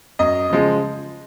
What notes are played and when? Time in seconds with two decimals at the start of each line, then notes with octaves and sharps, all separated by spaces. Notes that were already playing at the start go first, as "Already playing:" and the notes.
0.19 F#2 D#5
0.50 C#3 F3 G#3